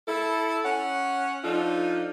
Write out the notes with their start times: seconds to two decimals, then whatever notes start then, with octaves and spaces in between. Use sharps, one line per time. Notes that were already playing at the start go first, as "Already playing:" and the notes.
0.07 E4 A4
0.63 C#4 F#5
1.43 F3 D4 D#4 F4 A4